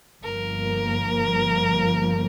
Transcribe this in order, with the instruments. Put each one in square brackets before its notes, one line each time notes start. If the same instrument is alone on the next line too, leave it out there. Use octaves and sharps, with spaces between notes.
[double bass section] G1 G2 F3 A#3 [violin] A#4